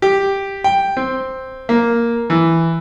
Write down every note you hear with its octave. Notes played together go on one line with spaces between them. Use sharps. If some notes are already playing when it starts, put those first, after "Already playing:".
G4
G5
C4
A#3
E3